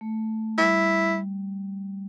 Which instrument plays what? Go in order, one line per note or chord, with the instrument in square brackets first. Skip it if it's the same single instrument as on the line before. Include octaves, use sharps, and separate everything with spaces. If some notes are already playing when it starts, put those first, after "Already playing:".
[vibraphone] A3
[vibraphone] G3 [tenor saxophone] E4